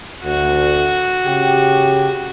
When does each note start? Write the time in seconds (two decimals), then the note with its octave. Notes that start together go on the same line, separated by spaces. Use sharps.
0.24 D2 F#4
1.25 C#3 G4